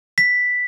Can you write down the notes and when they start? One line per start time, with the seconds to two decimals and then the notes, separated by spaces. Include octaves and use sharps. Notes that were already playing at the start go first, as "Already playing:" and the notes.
0.18 B6